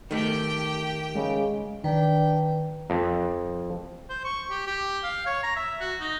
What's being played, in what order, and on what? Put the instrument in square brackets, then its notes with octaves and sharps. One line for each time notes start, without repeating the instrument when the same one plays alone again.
[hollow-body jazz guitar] D#3 A3 [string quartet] G4 G5
[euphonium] C#3 [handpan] G#3
[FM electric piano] D#3 [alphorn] D4 [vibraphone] B4 [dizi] G5
[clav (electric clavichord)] F2
[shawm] C5
C#6
G4
G4
F5
C#5
A#5
E5
F#4
D#4